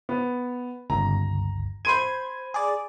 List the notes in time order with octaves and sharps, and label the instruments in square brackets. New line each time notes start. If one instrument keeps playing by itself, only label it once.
[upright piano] B3
[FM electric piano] G1 C#2 [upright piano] A#5
[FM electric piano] C5 G#6 [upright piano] B5 C6 D#7
[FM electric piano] G#4 D5